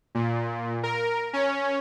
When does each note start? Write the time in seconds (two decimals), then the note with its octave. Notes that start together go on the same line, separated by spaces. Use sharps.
0.15 A#2
0.83 A#4
1.33 C#4